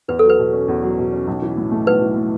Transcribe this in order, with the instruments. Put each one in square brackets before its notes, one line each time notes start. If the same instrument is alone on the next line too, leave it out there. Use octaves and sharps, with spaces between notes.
[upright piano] E2 [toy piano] B4
[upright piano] F#3 [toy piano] A4
[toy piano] B4
[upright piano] B2
C#4
E2
F#3
B2
C#4
B1
E3
A2
A3
[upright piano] B1 [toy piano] B4
[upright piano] E3
A2